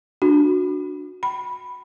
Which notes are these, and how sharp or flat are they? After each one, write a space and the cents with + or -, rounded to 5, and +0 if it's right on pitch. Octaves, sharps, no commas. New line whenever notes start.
D4 +10 F#4 -15
G5 -35 B5 +0